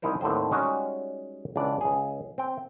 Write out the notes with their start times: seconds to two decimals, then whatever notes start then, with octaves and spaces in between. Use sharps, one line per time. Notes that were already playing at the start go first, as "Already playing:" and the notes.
0.02 C2 D#4 E4 A#4 C5
0.21 D#2 A2 D3 C4 C5
0.51 G3 G#3 C#4 D#4 F#4
1.56 C#2 E3 D4 D5
1.81 C#2 G#4
2.38 C4 G5